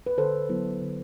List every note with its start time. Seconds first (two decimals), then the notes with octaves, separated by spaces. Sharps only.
0.06 B4
0.18 D3 A4 C5
0.49 F#3 B3 E4
0.81 D3